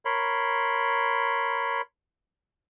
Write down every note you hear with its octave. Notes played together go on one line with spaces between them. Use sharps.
A#4 C#5 B5 C6